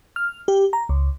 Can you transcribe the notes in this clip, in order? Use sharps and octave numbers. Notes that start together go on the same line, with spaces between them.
F6
G4
A#5
C#2